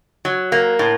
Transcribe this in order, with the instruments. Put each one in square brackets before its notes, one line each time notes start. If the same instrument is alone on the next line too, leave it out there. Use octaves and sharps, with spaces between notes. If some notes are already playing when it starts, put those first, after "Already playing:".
[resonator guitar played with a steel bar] F#3
A#3
A2